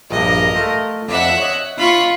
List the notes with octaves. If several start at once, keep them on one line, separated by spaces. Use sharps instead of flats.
A#1 G2 A#4 D#5
A3 F4 A5
F2 D5 E5 F#5
C#5 D#5
F4 B5 C#6